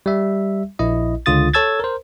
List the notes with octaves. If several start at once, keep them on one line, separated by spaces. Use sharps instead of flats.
G3 E5
A#1 E4 D#5
C#2 D3 F4 D#6 A6
A4 C#5 A5 E6 G#6 A6
A#4 C5